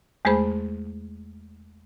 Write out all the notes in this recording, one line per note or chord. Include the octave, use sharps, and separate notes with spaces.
E2 G#3 A3 G#4 C5 B5